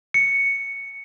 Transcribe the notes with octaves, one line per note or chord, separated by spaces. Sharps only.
C#7